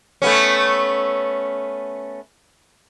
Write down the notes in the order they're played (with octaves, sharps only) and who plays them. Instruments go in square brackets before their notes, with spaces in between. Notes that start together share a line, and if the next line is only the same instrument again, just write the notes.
[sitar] A3 B3 C#4